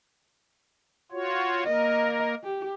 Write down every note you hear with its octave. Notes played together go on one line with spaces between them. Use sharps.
F4 F#4 C#5
A#3 A#4 D#5
G4